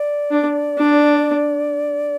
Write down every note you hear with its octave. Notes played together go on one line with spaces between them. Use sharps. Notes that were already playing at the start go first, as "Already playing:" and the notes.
Already playing: D5
D4
D4